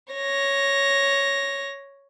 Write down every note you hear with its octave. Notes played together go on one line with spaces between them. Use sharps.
C#5 A#6